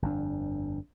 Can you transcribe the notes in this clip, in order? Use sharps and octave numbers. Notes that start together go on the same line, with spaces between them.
G1 F2 D4